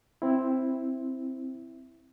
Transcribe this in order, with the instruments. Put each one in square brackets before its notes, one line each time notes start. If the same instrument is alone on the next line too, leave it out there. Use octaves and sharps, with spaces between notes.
[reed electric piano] C4 E4